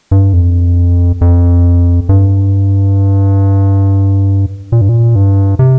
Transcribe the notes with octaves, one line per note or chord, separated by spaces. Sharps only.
G2
F2
F2
G2
A#2
G2
A#2
G2
C3